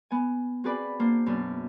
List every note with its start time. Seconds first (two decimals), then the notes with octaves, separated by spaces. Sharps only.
0.11 B3 G#5
0.64 C4 F#4 G#4 B4 D5 B5
1.00 A#3 D4 C5
1.26 F#2 B2 D4